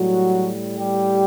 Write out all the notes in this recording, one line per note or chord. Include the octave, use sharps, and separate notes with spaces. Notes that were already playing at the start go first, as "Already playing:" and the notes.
Already playing: A2 F#3 G3 F#4
G3 G4